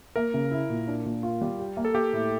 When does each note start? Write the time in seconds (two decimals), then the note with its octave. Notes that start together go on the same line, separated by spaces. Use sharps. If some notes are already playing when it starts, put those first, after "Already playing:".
0.16 A#3 A#4
0.34 C#3
0.51 E4
0.70 A#2
0.88 D4
1.05 A#2
1.23 F4
1.41 G3
1.59 G4
1.77 A#3
1.85 A4
1.94 A#3 G4
2.13 A2